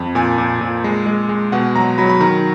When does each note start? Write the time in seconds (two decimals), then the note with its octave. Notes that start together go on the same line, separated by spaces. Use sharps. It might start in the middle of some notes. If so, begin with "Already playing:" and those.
Already playing: F2
0.15 A#2 G#5
0.38 A#2
0.61 A#2
0.84 G#3
1.06 G#3
1.29 G#3
1.52 B2 F#5
1.76 F#3 A#5
1.98 F#3 B5
2.09 B5
2.20 D#3 A#5